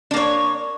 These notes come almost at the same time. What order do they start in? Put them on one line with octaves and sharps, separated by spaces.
D4 A#3 C#5